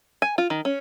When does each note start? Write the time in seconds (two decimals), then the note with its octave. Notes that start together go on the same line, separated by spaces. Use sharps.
0.22 G#5
0.38 F4
0.50 D#3
0.65 C#4